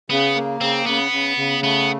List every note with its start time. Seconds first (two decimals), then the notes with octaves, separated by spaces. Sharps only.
0.10 C#3 B3
0.35 A#3
0.61 C#3 C4
0.86 C#3 B3
1.11 C#3
1.37 C#3
1.63 A3 B3